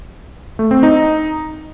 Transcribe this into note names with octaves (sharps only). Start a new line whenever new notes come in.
A3
C4
D#4